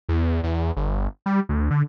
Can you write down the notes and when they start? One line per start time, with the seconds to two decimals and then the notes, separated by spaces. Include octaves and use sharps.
0.09 E2
0.43 E2
0.76 G1
1.26 G3
1.49 D2
1.71 D3